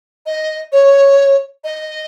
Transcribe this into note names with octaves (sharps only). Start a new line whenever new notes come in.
D#5
C#5
D#5